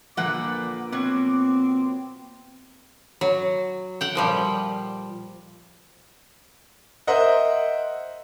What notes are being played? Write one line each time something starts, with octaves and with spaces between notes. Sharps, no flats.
A#2 D3 F3 A#3 B4 F#5 D6
B2 F#3 C4
F#3
F#5 G5
A#2 F3 G3
A#4 C5 D#5 E5 F#5